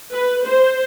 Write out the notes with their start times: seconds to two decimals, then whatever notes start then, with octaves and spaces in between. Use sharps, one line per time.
0.12 B4
0.44 C5